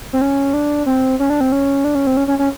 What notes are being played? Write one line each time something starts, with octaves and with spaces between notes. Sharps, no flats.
C4
C#4
D4
C4
C#4
D4
C4
C#4
D4
C#4
C4
C#4
C#4
C#4